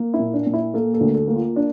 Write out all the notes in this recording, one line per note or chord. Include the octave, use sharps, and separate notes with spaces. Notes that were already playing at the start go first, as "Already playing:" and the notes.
Already playing: A#3
E4
A#2
D4
A#2
E4
A#3 A4
A4
D2
A4
A#3
F4
D4